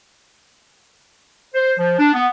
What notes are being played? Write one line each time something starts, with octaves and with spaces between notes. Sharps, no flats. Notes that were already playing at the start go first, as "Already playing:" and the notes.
C5
F3
D4
B3